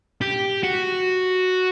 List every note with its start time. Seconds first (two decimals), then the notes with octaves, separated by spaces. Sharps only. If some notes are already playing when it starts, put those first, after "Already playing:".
0.21 G4
0.63 F#4